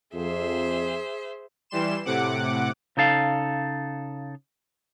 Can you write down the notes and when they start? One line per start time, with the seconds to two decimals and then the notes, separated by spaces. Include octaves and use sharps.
0.14 F2 G#4 C5 E5
1.70 E3 G3 C6 E7
2.05 A2 C3 F#5 D6
2.97 C#3 D#4 A4 F5